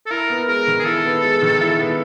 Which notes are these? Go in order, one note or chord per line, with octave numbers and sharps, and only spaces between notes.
A4
E4 A#4
B3
G#3 A#4
D#3
G#4
E4 A4
B3
G#3
D#3
E4
B3